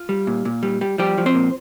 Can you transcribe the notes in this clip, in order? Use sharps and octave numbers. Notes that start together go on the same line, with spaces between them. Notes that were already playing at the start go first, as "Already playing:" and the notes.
Already playing: F4
G3
A#2
A#2
G3
G3
F3 G3 G4
F3
C4 C5
A#2